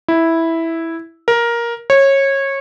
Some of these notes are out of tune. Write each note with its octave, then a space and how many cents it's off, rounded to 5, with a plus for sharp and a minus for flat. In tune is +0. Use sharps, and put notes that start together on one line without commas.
E4 -5
A#4 +10
C#5 -20